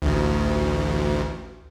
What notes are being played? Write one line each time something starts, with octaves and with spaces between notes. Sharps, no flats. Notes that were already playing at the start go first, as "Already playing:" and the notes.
A1 D2